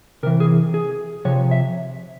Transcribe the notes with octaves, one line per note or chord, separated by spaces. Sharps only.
C3 E3 A#4
G#4
G#4
C3 F3 C#5
E5